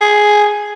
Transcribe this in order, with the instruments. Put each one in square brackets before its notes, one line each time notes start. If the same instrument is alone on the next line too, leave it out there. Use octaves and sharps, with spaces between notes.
[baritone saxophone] G#4